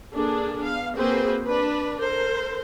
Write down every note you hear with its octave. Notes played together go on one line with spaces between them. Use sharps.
A#3 D4 G#4 A4
B3 F5
A#3 C4 F#4 G#4 B4 C5
D4 B4
A4 A#4 C5